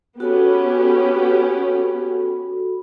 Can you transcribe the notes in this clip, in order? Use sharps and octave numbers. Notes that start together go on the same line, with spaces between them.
B3 C#4 F#4 G4 A4 B5